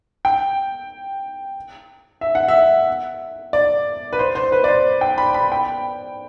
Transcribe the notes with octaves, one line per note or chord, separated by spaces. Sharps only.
G5
E5
F#5
E5
D5
B4
C5
C5
B4
D5
C5
G5
B5
B5
G5